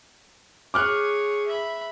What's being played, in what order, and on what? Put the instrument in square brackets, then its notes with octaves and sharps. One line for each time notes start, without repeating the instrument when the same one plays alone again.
[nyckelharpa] G#4 C#5 [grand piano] D6 F6 F#6
[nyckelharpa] E5 B5